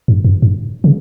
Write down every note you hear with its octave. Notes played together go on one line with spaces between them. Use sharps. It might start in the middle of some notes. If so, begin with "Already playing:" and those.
G2
F#2
G2
C#3